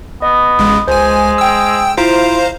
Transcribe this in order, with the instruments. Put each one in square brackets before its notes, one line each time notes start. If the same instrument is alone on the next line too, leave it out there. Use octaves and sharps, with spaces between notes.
[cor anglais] B3 [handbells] D#5
[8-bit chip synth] A1 C#3 G#3
[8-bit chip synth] C#2 G#5 [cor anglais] G#3 [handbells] C5
[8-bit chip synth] G5 E6
[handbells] E4 F4 D7 [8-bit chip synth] C5 F5 A#5